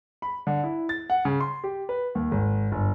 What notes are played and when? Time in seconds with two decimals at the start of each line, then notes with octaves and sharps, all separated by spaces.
0.22 B5
0.47 D3
0.64 E4
0.89 A6
1.10 F#5
1.25 C#3
1.40 C6
1.64 G4
1.89 B4
2.15 D#2
2.32 G#1
2.72 G1